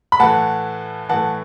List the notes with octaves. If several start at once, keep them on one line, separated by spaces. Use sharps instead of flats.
B5
A2 E3 F#5 A5
A2 E3 F#5 A5